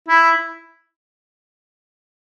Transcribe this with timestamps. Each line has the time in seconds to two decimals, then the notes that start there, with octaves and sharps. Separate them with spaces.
0.08 E4